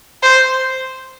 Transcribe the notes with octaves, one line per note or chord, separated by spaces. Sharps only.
C5